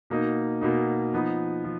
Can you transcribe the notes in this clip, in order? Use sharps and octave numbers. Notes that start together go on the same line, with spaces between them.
B2 A#3 D#4
B2 A#3 D#4
F3 B3 D#4
F3